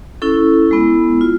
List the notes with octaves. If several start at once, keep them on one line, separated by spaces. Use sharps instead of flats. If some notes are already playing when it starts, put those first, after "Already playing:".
C#4 E4 A4
G#3 B3 E4
F4